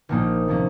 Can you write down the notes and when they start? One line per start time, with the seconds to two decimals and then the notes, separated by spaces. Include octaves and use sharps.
0.09 A#1 A#2 F3 A#3 D#4
0.48 C3 F3 A#3 C#4